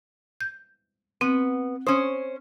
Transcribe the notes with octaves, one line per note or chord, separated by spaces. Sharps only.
G6
B3 C4
C#4 C5 D#6